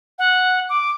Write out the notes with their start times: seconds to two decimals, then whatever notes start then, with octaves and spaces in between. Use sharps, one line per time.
0.19 F#5
0.69 D6